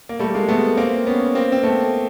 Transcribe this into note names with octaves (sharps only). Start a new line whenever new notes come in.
A#3
G3 A3
G#3 A#3
A3 B3
A#3 C4
B3 C#4
A#3 C4
C4
A3 B3